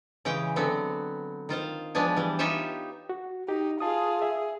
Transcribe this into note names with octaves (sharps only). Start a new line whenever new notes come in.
C#3 E3 G#3 G5
D3 F#3 B3 C4
D#3 F4 C5 F5
F3 G#3 B3 D4 G#5
E3 G3
D#4 F4 G4 C#5 E5 G#5
F#4
D#4 G4
F4 G#4 A5 D#6
G#4 E5